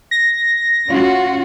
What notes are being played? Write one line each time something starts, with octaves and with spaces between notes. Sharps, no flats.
A#6
C#4 F4 F#4